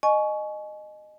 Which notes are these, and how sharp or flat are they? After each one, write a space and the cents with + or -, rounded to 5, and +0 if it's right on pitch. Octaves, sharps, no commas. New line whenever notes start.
D#5 -20 G#5 +30 C#6 +10